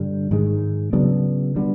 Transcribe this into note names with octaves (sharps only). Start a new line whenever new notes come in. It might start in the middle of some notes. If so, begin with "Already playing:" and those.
Already playing: G2 D3 G3
G#2 D#3 G#3
C#3 F#3 B3 D4
D3 G3 B3